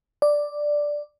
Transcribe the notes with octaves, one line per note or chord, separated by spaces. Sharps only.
D5